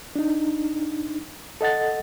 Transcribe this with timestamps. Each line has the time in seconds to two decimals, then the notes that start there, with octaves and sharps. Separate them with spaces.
0.16 D4 D#4
1.61 A4 D#5 F#5 A6